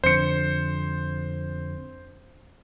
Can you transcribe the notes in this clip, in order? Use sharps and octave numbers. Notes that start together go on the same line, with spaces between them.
F2 D3 C5 C#7